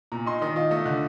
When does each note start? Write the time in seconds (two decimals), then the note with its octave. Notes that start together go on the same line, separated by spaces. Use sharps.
0.12 A#2 A#5
0.26 D#4 C6
0.41 D#3 D#5
0.56 F4 D#5
0.71 A3 D#5
0.85 D3